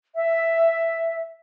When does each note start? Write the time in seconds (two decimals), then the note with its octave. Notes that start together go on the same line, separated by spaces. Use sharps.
0.15 E5